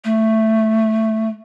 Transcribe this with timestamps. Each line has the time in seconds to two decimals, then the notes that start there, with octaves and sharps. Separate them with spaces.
0.05 A3